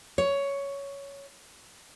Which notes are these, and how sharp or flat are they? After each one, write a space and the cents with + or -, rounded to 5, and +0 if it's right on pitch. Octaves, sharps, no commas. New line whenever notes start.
C#5 +10